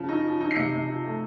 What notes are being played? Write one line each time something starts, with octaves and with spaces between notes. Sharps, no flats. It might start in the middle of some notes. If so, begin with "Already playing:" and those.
Already playing: C#3 F3
D#4
F3
D#4
C7
C3 C#7
C3
F3
A3